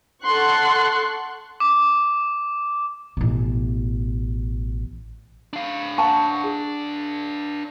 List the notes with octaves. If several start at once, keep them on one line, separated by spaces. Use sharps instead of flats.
A4 F#5 C6 C#6 F#6
D6
A1 B2
D4 F5
F#5 A5 C#6
G#4